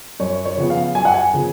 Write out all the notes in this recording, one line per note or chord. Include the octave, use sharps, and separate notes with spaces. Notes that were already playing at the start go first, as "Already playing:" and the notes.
F#2 C#5
C#5
C#3 F3 B3
F5
F#2 G#5
F#5
G#5
C#3 F3 B3